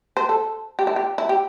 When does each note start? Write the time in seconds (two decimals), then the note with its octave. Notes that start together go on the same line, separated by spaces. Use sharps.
0.17 C5
0.29 A4
0.79 G4
0.87 E4
0.96 G4
1.18 E4
1.29 G4